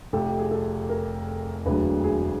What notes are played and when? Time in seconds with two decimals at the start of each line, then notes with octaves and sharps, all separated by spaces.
0.13 F1 F2 C3 A4
0.26 G4
0.39 G#4
0.51 A4
0.89 A#4
1.66 E1 D2 D3 F#3 B4
2.04 G#4